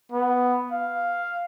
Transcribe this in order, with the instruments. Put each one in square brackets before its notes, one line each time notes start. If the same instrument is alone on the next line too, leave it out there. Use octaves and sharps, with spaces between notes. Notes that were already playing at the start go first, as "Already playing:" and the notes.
[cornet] B3
F5